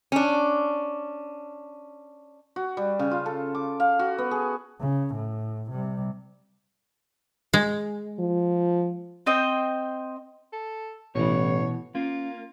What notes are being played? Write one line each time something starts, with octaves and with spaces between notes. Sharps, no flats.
C#4 D4
F#4
G3
C#3
F4
A4
D6
F5
F#4
B3
G#4
C#3
A2
C3 G3
G#3
F3
C4 C5 D#5 G5
A4
A1 B2 E3 C#5
A#3 C#4 F4